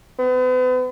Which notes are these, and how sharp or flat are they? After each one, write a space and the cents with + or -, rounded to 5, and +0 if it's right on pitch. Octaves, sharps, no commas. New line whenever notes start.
B3 +40